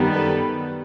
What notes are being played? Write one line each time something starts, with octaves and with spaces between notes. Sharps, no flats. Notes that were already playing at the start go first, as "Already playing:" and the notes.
Already playing: F#2 D#3 G3 B3
A4 B4